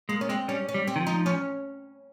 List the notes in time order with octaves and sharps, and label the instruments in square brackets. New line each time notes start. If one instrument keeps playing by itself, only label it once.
[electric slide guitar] G#3 [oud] A#3
[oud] C#4
[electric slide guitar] G#3 [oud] C4
[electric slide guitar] G3 [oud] C#4
[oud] C#4
[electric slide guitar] G3
[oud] C4
[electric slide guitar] D#3
F3
[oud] D#4
C#4